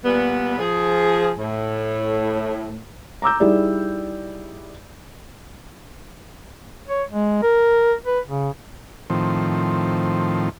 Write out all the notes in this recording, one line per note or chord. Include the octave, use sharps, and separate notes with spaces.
A#2 G3 B3
F3 G#4
A2
A#5 D6 E6 G6
G3 D#4 E4 G#4 D5
C#5
G#3
A#4
B4
C#3
A2 D#3 F3 C4